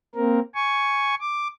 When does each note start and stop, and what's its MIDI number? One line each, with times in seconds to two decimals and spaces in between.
0.15 0.40 58
0.15 0.40 60
0.15 0.40 70
0.55 1.15 80
0.55 1.15 85
1.21 1.48 86